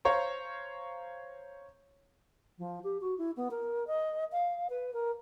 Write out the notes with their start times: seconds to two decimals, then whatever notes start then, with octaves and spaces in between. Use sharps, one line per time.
0.05 C5 C#5 F5 A#5 C#6
2.58 F3
2.83 G4
3.01 F#4
3.18 E4
3.36 B3
3.50 A#4
3.87 D#5
4.31 F5
4.69 B4
4.93 A#4